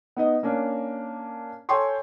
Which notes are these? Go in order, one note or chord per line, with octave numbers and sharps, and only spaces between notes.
B3 D#4 D#5
A#3 C#4 D4
A4 C#5 G5 G#5 C6 C#6